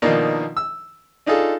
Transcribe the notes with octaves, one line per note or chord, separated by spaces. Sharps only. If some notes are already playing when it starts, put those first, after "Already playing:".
B2 D#3 F3 A#3 D4 D#4
E6
D4 D#4 F4 G#4 A4